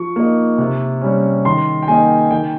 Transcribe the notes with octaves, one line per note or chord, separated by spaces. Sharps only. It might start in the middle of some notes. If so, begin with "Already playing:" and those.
Already playing: F3 C#6
A#3 D#4
C3
G3 C#4
D#3 C6
G5
A#3 D#4 G#5
D#3 G5